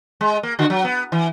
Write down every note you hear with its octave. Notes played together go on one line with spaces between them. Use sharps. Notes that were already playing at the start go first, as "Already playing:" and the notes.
G#3
A#3
D3 F#4
F#3
B3
E3